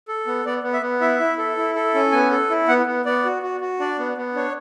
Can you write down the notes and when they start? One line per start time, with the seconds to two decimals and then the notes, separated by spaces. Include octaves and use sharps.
0.08 A4
0.27 B3
0.45 B3 D5
0.63 B3
0.73 E5
0.82 B3
1.00 E4 E5
1.19 E4
1.38 A4
1.57 E4
1.75 A4
1.94 C#4
2.12 B3 G#5
2.31 A4
2.50 E4
2.68 B3 F#5
2.86 B3
3.05 B3 D5
3.25 F#4
3.42 F#4
3.61 F#4
3.80 D4 D5
3.99 B3
4.17 B3
4.35 D4 C#5